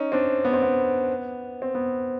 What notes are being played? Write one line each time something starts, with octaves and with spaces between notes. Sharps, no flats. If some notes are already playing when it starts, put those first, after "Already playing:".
Already playing: C#4 D#4
C4 D4
B3
C4
B3
C4
B3